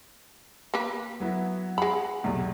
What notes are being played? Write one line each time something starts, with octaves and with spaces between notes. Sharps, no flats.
A#3 B4
F#3 B3 E4
G#3 F#5 B5
B1 E2 C3